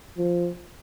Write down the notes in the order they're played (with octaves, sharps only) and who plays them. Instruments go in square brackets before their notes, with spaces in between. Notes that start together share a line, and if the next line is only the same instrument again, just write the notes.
[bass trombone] F3